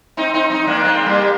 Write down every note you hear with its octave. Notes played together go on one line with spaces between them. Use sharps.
C4 D#4
C4 D#4
C4 D#4
A#3 D4
G#3 C4
G3 A#3